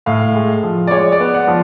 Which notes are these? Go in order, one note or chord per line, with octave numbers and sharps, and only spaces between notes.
A2 F5
G#3
F3
D5
G#3 C#5
D5
B3
F#5
F3